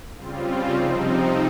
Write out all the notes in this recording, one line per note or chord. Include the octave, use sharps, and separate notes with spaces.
C#3 G3 C4 F4
C3 F3 C4 D#4